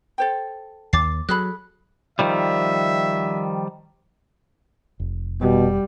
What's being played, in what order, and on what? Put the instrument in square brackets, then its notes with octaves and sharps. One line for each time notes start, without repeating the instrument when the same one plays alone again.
[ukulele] A4 C5 G5
[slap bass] D#2 [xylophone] D6 A6 C7
[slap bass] F#3 [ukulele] G#4 A4 B5 [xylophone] F#6
[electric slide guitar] D#3 F3 G3 [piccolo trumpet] E5
[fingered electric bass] F1
[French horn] B2 [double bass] G3